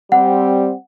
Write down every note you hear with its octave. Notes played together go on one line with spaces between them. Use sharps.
G3 C4 F#5